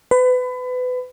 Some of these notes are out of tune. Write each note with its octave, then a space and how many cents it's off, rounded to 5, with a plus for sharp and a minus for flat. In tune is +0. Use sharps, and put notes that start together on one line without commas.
B4 +30